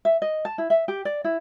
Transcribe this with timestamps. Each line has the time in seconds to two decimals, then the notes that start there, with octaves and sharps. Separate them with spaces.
0.05 E5
0.22 D#5
0.45 A5
0.58 E4
0.70 E5
0.88 G4
1.05 D5
1.24 E4